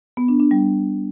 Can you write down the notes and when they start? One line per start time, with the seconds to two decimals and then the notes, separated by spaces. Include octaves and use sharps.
0.17 B3
0.28 D4
0.40 D4
0.51 G3